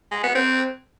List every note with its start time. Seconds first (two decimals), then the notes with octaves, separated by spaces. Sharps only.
0.11 G#3
0.23 B3
0.35 C4